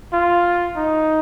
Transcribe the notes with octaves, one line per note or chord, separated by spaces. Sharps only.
F4
D#4